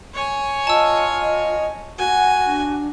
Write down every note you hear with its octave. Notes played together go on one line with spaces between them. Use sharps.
C#5 G#5
F4 D#5 A5 E6
D#5
F#4 F#5 G#5
D4